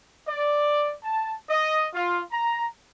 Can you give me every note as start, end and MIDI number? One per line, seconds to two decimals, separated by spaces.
0.28 0.94 74
1.04 1.35 81
1.49 1.85 75
1.94 2.21 65
2.31 2.68 82